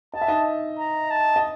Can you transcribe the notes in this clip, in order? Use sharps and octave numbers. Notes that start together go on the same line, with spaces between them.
D#5 A5
E5
D#4 D#5
A#5
A5
D#5